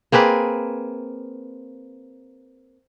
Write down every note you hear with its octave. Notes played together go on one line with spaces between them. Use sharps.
A#3 C4 G#4 B4